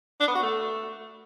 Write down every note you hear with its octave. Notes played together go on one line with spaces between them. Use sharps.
D4
B3
F#4
A3